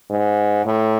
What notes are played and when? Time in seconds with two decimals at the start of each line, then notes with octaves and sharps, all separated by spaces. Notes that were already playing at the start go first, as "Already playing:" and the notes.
0.10 G#2
0.66 A2